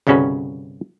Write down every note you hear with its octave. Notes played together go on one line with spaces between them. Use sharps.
G1 C2 C#3 C#4 F#4 B4